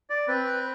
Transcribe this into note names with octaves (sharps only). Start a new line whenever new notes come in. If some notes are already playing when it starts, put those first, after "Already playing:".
D5
C4 B4